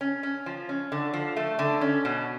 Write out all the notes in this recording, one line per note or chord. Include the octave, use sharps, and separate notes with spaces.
C#4
C#4
F3
C#4
D3
F3
A3
D3
C#4
B2